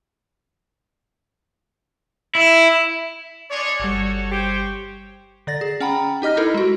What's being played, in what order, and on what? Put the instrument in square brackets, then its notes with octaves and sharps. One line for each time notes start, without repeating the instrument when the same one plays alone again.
[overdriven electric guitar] E4
[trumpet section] G#3 D4 C#5 [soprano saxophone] D5
[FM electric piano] G1 G3 [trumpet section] F#4 A4 C#5
[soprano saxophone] G4 [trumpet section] C5 C#5 G5
[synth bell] D3 D5 A6 A#6
G#4
C#4 F#5 G5 A#5 B5
D#4 G4 D#5 F6 A#6
D#4 E4 A4 A#4
G#3 F#4